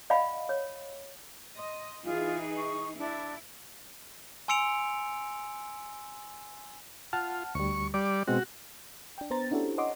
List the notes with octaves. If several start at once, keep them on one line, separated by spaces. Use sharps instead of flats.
D5 D#5 F5 F#5 G#5 B5
C#5
D#5 C6
E3 D#4 F4 G#4
C#6
D4 E4
G#5 C6 E6 C#7 D7 F7
F4 F#5 A5 F6
D2 G3 C#6
G3 D5 D6
B2 G#3 C4 F#4
D4 G5
B3 C5 A#5 A6
C#4 D4 E4 F#4 G4 A4
C#5 D#5 F#5 C6 D6